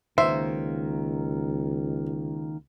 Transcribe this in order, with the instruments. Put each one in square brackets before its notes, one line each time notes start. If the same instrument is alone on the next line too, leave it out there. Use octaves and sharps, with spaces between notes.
[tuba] C#2 [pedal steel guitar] D#3 A#3 [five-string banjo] C5 [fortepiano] E5